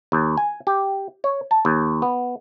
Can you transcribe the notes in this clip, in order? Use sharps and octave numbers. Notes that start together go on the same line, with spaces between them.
D#2
G#5
G4
C#5
A5
D#2
B3